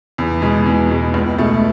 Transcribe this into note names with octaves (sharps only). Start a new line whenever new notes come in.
E2
B2 G#3
E2
B2 G#3
C#2
B2 A3